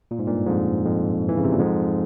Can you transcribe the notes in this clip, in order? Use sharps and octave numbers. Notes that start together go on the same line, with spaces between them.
A#2
G#2
G2 A#2
F2 G#2
F2
E3
C#3
C3
A#2
F2 G#2